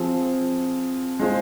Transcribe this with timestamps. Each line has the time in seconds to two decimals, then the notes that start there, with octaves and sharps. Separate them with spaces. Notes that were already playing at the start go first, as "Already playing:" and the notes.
Already playing: F3 C4 G#4
1.20 G#3 F4 G#4 C5